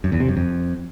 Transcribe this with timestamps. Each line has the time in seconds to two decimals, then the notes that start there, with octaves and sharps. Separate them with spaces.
0.04 F#2
0.12 E2
0.20 C3
0.28 F#2
0.37 F2